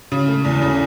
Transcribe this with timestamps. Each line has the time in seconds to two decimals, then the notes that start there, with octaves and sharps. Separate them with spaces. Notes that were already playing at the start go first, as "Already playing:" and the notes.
0.12 C#3
0.28 A3
0.45 E2
0.62 C#3